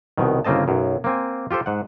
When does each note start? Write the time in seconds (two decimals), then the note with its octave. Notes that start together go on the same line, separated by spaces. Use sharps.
0.18 C2 B2 D#3
0.45 G1 C#3 A#3 C4 D#5 A5
0.68 B1 F#2
1.04 A#3 C4 G#5
1.51 F4 G4 A4 C5
1.66 G#2 F#5